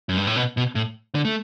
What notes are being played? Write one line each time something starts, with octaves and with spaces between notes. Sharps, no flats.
F#2
G2
A2
B2
B2
A2
D3
A3